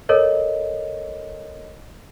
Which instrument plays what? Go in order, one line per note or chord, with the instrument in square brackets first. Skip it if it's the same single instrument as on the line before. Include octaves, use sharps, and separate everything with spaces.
[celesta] A4 A#4 C#5 D#5